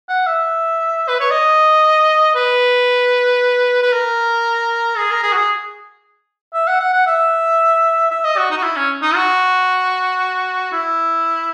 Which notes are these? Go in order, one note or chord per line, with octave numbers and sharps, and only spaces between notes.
F#5
E5
B4
C#5
D#5
B4
B4
A#4
G#4
A#4
G#4
F#4
G#4
E5
F#5
F#5
F#5
E5
E5
D#5
F#4
D#4
F#4
E4
C#4
D#4
F#4
E4